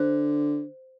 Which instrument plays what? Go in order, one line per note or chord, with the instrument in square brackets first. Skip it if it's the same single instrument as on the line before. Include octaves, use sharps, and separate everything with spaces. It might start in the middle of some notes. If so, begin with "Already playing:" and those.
Already playing: [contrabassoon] D3 [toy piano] C5